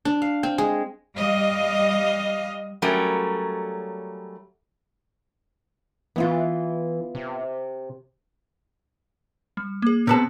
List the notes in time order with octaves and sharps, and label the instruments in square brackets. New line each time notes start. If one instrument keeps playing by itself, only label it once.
[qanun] D4
F5
C4
G#3
[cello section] G3 D#5 F5
[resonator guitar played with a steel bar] F#3 G3 A3 C#4 A#4
[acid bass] E3 [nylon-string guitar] B3 E4 F4
[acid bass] C3
[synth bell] G3
A#3 G#4
[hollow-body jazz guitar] C3 B3 A5 [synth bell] C4 G#4